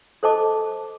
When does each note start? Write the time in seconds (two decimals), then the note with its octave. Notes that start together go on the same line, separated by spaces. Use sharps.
0.23 A4 C5 D#5 A5 D6